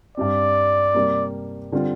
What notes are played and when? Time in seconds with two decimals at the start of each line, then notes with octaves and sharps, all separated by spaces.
0.17 G2 G3 C4 D5
0.94 C3 G3 A#3
1.72 D3 G3 C4 F4